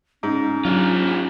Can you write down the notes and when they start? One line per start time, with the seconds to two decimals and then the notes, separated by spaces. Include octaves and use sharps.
0.23 G#2 C#4
0.65 F#3 D4 F4